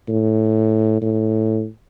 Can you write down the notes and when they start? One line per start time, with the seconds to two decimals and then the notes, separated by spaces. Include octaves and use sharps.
0.09 A2
1.02 A2